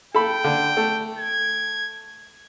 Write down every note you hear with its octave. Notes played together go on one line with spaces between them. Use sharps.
A4 G5 B5
D3
A3
G#6